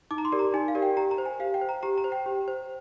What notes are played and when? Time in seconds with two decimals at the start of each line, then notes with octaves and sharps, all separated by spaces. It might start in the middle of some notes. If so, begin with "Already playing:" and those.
0.11 D#4 D6
0.18 A#5
0.25 C6
0.32 G4 A#4 D5
0.39 A#5
0.54 D#4 G#5
0.68 F5
0.75 G4 A#4 D5
0.82 G5
0.97 G4 A#5
1.11 A#5
1.18 C5
1.26 G#5
1.40 G4 F5
1.54 G5
1.61 C5
1.69 A#5
1.83 G4 A#5
1.98 A#5
2.04 C5
2.12 G5
2.26 G4
2.48 C5